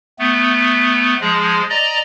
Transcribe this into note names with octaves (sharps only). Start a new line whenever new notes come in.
A3 B3
F3 G#3 G#4
D5 D#5 A#5